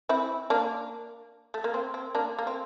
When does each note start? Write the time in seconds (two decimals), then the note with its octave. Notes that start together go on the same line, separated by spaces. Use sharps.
0.09 C4 E4
0.50 A#3 D4
1.54 A3
1.64 A#3
1.74 C4
1.94 C4
2.15 A#3 D4
2.39 A#3
2.47 C4